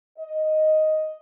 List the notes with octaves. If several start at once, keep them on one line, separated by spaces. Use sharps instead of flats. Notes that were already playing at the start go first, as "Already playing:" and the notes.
D#5